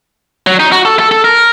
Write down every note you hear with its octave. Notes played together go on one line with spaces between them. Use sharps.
F#3
D#4
F#4
A4
A4
A4
A#4